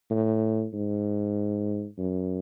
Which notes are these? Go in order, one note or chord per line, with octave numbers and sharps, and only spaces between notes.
A2
G#2
F#2